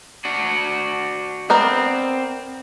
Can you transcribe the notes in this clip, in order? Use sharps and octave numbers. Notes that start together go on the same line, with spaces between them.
D4 F#4
B3 C4 A#4 D5